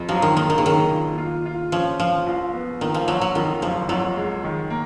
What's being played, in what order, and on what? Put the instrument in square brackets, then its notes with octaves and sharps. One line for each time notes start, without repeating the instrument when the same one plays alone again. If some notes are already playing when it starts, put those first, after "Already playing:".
Already playing: [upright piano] F2
[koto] F3 [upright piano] F#3
[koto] D#3
[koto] D#3 [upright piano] A#3
[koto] D#3
C#3
[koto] D#3 [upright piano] F#3
[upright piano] A#2
F4
F4
[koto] F3 [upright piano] C#4
[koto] F3 [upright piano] F4
[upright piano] A#1
B3
[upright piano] A#2 [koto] D#3
[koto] F3
[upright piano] A#1 [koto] F#3
[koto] F#3
[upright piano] F2 [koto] D#3
[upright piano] F#1 [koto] F3
[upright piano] F2 [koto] F#3
[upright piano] G#3
D#3
A#3